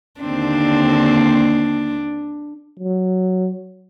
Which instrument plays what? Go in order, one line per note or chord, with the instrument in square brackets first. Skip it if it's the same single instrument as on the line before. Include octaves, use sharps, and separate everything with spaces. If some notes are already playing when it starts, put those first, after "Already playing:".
[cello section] D#2 D3 C4 [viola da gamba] D4
[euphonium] F#3